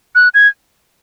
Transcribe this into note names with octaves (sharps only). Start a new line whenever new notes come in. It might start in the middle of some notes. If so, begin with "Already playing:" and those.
F#6
G#6